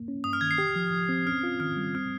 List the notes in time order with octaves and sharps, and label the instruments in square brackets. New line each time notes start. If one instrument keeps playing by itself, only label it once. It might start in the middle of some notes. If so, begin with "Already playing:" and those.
Already playing: [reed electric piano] A#3
C#4
[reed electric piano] G2 [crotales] D#6
[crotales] F6
[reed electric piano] D#3 [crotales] G#6
[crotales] C7
[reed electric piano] G4
F3
F3
C4
[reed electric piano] C#4 [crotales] F6
[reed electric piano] F4
[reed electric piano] D#3 [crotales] F6
[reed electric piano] G3
[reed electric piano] C4 [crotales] F6